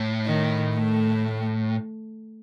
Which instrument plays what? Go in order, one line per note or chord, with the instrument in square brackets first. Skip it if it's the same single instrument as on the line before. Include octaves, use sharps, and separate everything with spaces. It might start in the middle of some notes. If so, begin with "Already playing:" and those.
Already playing: [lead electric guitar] A2
[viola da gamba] D#3
A3